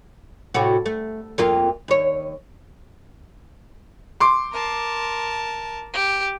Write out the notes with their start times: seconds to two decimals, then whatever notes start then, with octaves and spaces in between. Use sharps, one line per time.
0.54 A2 C3 F#4
0.86 A3
1.38 F2 A#3 F4
1.88 D#2 C#5
4.20 C6 D6
4.52 A#4 A5
5.93 G4